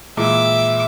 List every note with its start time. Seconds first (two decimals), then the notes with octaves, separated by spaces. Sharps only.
0.17 A#2 E3 G#3 E5 D6